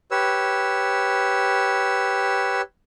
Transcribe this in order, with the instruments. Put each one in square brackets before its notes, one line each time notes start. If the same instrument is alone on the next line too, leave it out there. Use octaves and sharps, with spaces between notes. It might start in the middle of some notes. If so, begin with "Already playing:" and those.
[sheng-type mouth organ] G4 B4 C#5 E6